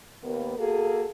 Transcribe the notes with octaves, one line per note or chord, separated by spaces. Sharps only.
D#2 A#3 B3
A#3 F#4 G#4 A4